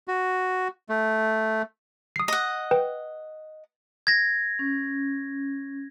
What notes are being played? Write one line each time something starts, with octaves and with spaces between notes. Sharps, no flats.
F#4
A3
D#6 C7
D#5 F#5
B4 G5
G#6 A#6
C#4